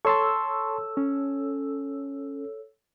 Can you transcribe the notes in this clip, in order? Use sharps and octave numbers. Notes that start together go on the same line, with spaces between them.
A4 C#5 A5 C6 C#6 E6
C#4